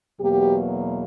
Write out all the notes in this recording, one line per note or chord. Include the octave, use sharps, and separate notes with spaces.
E2 B2 F#3 A#3 G4